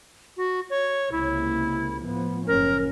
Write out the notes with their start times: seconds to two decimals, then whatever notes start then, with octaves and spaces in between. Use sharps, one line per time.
0.37 F#4
0.70 C#5
1.12 C#2 C3 A#3 E4
2.04 A2 F3 B3
2.47 F#1 C#4 A#4